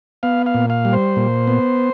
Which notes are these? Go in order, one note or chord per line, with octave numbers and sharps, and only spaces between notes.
B3 F5
F5
A#2
F5
G3
C5
A#2
B3